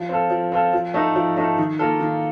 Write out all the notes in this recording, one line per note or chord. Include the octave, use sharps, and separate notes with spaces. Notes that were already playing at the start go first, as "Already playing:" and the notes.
Already playing: F3
C4 F4 A4
F3
C4 F4 A4
F3
A3 D#4 A4
F3
A3 D#4 A4
D#3
A#3 F4 A4
D#3